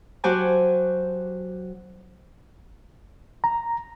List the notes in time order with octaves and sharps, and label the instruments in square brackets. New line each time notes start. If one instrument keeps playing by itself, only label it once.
[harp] F#3 F#4 G4 C5 G#5 A5
[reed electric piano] A#5